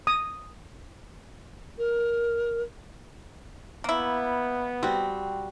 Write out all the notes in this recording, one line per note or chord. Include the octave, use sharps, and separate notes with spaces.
D#6
A#4
A#3 B3 E4
G3 C4 F#4